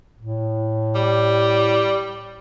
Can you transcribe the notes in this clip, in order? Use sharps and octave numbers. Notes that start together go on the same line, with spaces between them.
A2
G3